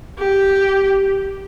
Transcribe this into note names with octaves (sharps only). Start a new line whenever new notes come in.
G4